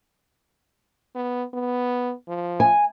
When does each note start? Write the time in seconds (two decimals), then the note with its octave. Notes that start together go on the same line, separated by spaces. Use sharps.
1.15 B3
1.54 B3
2.28 F3
2.60 G#5